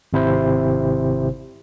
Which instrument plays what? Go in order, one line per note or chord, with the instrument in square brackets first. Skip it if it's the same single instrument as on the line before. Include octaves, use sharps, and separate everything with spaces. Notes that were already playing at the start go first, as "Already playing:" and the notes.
[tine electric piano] G#1 C3 E4 C5